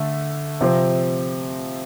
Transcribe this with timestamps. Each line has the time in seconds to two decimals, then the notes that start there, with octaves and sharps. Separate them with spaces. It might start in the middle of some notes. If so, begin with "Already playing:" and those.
Already playing: D3 A3
0.61 C3 F3 C4